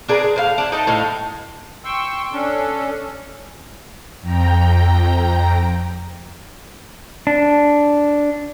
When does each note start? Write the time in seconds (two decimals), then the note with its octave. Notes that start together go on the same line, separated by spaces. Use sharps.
0.08 D4 G#4 A#4 B4
0.23 G#3
0.36 A2 F5
0.58 D4 E4
0.72 D#4 A4 D#5
0.87 A2 D#5 F5
1.85 G5 C6 C#6 E6
2.33 C#4 D4 A4
4.22 F2 G5 A#5
7.27 D4